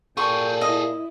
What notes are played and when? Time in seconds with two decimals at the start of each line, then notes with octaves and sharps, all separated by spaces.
0.17 A#2 G#4 A4 G5 C#6
0.61 E4 D#5